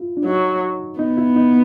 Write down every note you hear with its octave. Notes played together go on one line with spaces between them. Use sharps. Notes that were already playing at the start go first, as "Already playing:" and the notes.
Already playing: E4 F4
D4
F#3 D#4
B3 D#4
E4
D#4